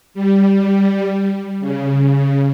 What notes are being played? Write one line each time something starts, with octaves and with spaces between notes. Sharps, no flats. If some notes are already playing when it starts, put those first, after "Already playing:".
G3
C#3